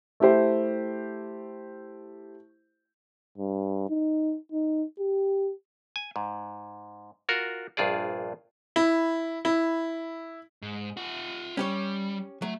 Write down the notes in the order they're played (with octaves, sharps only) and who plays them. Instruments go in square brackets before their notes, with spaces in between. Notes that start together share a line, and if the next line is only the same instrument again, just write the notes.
[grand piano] A3 E4 G4 C5
[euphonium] G2
D#4
D#4
G4
[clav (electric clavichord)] G#5
G#2
F4 F#4 A#4
A#1 G2 F4 G#4 D5
[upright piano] E4
E4
[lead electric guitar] G#2
F4 F#5
[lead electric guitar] G3 [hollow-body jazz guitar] C#4 G4 C#5
[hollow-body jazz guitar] F#3 [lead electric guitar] A3